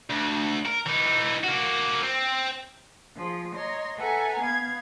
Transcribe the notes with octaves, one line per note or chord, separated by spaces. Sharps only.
D2
A#4
E3 D#4
A#3 F#4
C4
F3 F4 G#4
C#5 D#5 A#5 C6
A4 B4 E5 F#5 G#5 A#5
B3 F5 G#6